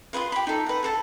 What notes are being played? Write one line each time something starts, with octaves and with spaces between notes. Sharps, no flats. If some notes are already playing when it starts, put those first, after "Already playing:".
F4 G#4 B4 F5
G4 B5
D#4 A4
B4 F#5
G#4 A4 A5